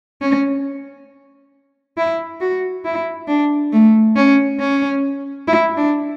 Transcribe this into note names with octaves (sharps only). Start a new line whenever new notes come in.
C#4
E4
F#4
E4
D4
A3
C#4
C#4
E4
D4